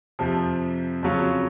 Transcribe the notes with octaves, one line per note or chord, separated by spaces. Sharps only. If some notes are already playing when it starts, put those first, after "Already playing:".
F2 C3 F3
F2 C#3 F#3 C#4 F4